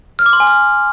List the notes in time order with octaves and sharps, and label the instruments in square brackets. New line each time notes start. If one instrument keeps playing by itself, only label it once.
[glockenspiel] F6
D6
C6
G#5
F6